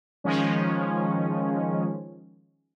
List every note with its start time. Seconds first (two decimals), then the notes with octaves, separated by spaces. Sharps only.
0.24 D#3 F3 G#3 C#4